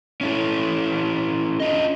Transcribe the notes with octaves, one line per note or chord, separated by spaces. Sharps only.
C#4 E4 A4
D4 F4 D#5